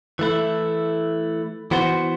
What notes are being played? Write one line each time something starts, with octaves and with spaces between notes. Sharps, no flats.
E3 A3 E4
E3 B3 F#4 C5